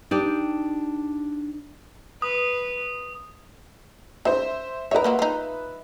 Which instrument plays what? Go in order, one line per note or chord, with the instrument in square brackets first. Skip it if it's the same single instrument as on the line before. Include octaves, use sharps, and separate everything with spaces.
[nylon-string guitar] D4 D#4 G4 D5
[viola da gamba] B4 [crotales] D#6
[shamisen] C#3 [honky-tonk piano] C5 E5
[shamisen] A#4 C#5 [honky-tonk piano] B4 D#5 E5
[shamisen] A#3 F4 F#4
D#4 F4